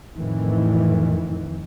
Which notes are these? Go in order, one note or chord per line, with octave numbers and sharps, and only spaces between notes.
F2 A2 D#3 E3